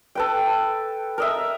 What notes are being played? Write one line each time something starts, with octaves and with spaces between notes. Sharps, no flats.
A4 B4 G5
A#4 D#5 E5